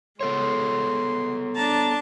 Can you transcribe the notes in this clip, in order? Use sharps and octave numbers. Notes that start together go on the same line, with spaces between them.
G#3 B3 A4 C#5 C6
D4 A5 A#5